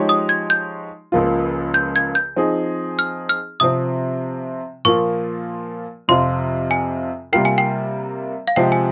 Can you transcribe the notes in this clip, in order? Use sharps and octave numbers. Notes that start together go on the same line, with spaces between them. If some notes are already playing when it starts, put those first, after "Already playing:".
Already playing: F3 G#3 D#4 G4 C#5
D#6
G#6
G6
C#2 C#3 F3 A#3 F4
G6
G#6
G6
F3 C4 D#4 G#4
F6
F6
C3 F3 C4 D#6
A#2 F3 A#3 F4 C#6
F2 C3 F3 C4 F4 C6
G#5
C3 G3 A#3 F4 A#4 G5
G#5
G5
F5
C3 F3 G#3 C4 G4 G5
G#5